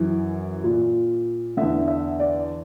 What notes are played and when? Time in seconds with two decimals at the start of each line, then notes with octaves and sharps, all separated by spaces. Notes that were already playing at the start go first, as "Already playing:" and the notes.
Already playing: F#2 E3
0.64 A#2
1.57 E2 D3 E5
1.88 E5
2.20 D5